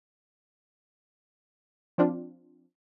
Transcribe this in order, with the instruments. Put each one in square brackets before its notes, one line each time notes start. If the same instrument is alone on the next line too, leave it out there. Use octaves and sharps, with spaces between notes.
[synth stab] F3 C4 D4 F4